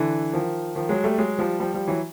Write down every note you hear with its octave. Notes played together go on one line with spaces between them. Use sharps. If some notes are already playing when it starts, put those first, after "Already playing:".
Already playing: D3 E3
D#3 F3
D#3 F3
F#3 G#3
G3 A3
F#3 G#3
F3 G3
F3 G3
F3 G3
E3 F#3